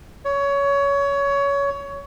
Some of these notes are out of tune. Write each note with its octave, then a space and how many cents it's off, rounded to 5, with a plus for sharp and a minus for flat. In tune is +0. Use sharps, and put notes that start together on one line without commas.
C#5 +20